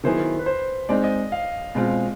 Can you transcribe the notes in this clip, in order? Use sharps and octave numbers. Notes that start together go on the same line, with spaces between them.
D#3 F#3 B3 E4 G#4 C5
B4
C5
G#3 C4 D#4 D5
D#5
F5
B2 G#3 C4 F4